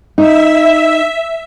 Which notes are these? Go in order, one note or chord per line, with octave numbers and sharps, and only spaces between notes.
D#4 E5